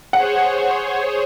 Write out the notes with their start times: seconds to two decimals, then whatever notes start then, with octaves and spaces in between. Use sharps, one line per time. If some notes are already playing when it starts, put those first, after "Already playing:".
0.13 G#4 C5 C#5 F#5